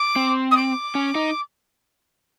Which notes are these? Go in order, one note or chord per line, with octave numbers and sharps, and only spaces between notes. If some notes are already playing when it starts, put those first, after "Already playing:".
Already playing: D6
C4
D#6
D6
C#4
D#4